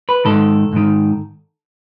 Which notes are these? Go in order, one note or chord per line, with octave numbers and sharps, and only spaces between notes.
B4
G#2 D#3 A4
G#2 D#3